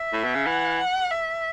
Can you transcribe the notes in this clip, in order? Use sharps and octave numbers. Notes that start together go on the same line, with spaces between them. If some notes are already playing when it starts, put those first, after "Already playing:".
Already playing: E5
A2
B2
C#3
E3 F#5
F#5
E5